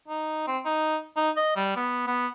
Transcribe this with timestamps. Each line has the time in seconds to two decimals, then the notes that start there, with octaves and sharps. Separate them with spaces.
0.08 D#4
0.47 C4
0.65 D#4
1.16 D#4
1.37 D#5
1.56 G3
1.76 B3
2.07 B3